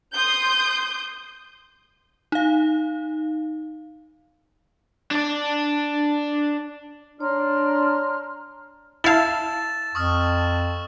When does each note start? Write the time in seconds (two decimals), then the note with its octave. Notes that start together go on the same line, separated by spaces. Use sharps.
0.14 C6 D#6 G6
2.32 D#4 F5
5.11 D4 D5
7.20 D4 C#5 A#5 C6 F6
9.04 E4 F5 A5 E6 A6 E7
9.95 F2 C#6 D#6 F6